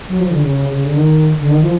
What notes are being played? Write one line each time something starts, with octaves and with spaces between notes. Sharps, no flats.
F#3
F3
D3
C#3
C#3
D3
D#3
D3
D#3
F3